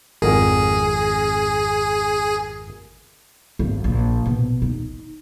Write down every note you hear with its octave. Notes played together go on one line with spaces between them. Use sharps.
G#1 F2 G#4 A#4
G#1
A#1
B2
D#4